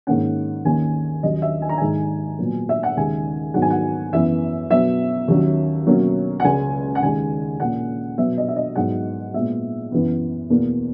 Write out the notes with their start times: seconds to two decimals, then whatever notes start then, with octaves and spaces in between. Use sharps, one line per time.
0.07 G#2 D#3 A#3 C#4 F#5
0.65 D#2 D#3 A#3 C#4 G#5
1.23 D#2 D#3 F#3 C#4 D#5
1.42 E5
1.62 G#5
1.69 A#5
1.78 G#2 D#3 G#3 G#5
2.39 A#2 F#3 B3
2.69 E5
2.83 F#5
2.97 D#2 C#3 G#3 G#5
3.54 G#2 D#3 F#3 B3 F#5
3.62 G#5
3.70 F#5
4.13 F#2 E3 B3 E5
4.70 B2 F#3 B3 E5
5.28 D#2 D#3 F#3 C#4
5.86 B2 F#3 A#3 C#4
6.40 F#5
6.45 C#2 C#3 G#3 G#5
6.95 F#5
7.02 D#2 C#3 G#3 G#5
7.60 A#2 A#3 C#4 F#5
8.18 B2 F#3 B3 E5
8.38 D#5
8.48 E5
8.56 D#5
8.76 G#2 F#3 B3 F#5
9.34 A#2 G#3 B3 E5
9.92 F#2 E3 B3
10.50 E2 B2 A#3